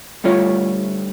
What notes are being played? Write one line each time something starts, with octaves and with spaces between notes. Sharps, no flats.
D2 G3 A3 F4 C#5